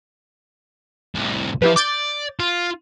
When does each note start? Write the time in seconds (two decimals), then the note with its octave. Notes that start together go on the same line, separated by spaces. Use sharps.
1.15 C2 A2
1.62 F3 E4 G4 B4
1.76 D5 D6 G6 A6
2.40 F4